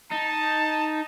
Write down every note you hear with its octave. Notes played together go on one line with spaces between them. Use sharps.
D#4 A5